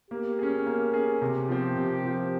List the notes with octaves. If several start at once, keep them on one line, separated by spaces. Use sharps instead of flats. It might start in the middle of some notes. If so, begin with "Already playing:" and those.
A#3 G4
C#4 G#4
A#3
C#4 G#4
C3 G4
F3 C4
C3
F3 C4